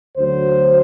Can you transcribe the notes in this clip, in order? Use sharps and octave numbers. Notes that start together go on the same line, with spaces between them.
D2 D3 F#3 C5